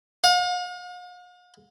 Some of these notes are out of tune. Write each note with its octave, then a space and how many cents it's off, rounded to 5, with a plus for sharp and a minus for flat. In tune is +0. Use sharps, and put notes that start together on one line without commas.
F5 +45